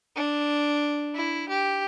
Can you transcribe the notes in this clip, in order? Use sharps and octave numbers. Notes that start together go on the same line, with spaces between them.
D4
E4
G4